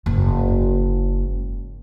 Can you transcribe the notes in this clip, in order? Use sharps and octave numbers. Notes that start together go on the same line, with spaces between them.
F#1 G#2